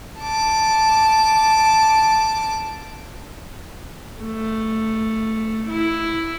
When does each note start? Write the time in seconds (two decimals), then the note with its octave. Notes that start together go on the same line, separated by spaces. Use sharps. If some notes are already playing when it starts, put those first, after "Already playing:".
0.20 A5 D6
4.21 A3
5.69 E4